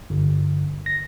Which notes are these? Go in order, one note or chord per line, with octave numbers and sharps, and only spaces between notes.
G1
A#6